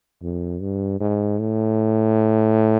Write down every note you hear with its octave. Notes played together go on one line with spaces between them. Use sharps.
F2
G2
G#2
A2